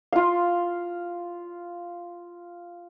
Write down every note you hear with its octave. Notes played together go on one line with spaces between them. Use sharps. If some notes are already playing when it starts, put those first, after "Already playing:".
F4 F5